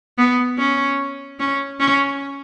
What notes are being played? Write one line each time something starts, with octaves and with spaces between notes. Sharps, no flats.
B3
C#4
C#4
C#4